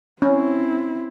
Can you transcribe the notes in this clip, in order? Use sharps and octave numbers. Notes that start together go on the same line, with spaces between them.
C4 C#4 E4